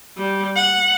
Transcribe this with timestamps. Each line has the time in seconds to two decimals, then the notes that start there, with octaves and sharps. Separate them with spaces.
0.18 G3
0.56 F#5